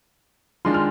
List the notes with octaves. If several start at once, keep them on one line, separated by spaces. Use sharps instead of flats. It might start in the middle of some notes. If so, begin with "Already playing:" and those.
D#3 G#3 D4 F4 C6
F6